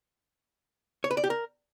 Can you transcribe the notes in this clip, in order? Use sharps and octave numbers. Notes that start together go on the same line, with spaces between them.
C#5
B4
D5
G4
A#4